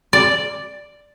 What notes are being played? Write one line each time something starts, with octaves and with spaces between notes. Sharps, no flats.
D5